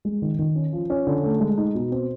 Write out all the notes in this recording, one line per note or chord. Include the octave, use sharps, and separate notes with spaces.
G#3
D#3
D#3
C#4
F3
C#4
D3
A3
G#3
D#4
B2
C4